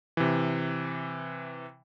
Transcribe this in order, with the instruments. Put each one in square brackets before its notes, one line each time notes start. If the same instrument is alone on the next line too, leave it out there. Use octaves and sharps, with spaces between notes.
[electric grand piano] C3 E3